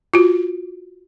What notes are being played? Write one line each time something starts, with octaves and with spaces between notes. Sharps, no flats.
F4 F#4